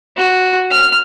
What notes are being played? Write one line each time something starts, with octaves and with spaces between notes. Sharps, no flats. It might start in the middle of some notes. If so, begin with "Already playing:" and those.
F#4
F6